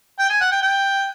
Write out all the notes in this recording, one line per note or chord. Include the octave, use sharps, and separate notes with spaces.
G5
G#5
F#5
G5
G5